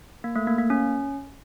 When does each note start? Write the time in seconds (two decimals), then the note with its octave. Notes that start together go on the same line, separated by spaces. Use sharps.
0.24 A#3
0.36 A3
0.47 A#3
0.59 A#3
0.70 C#4